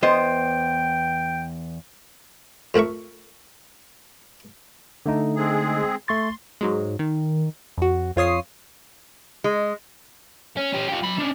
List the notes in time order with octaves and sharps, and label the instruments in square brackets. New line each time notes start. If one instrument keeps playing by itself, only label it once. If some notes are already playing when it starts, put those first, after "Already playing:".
[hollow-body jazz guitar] E2 B3 D#5 [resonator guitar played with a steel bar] C5 [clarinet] G5
[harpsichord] F2 A3 A#4 E5 C#6
[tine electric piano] D3 A3 D#4
[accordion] G#3 C4 G#4
[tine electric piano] A3 C#6 A6 [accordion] C6
[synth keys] G#2 F#3 G#3
D#3
F2 F#4
F2 F4 C#5 D#6 C7
[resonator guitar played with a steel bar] G#3
[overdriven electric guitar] C#4
C#4 G4
F4 G4
F#3 B5
C#4 D4